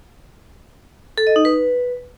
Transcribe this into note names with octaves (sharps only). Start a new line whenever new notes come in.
A4
D#5
D#4
B4